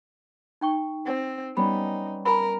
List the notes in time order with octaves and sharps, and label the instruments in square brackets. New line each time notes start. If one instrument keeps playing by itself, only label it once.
[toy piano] D#4 G5 C#6
[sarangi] C4
[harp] G3 B3 C#4 [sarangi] D#4 [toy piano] B5
[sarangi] A#4 [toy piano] G#5 B5